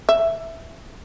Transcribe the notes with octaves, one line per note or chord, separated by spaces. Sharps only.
E5